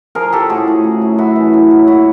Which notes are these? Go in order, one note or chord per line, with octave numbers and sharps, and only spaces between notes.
F3 G#4 A#4
F3 G4 A4
A2 F#4 G#4
A2
C#3
F#2
F#2 E4 F#4
E3
F#3
F#3
A#2 E4 F#4